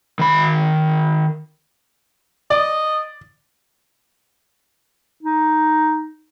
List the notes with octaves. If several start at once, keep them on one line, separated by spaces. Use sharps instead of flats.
D#3 B5
D5 D#5
D#4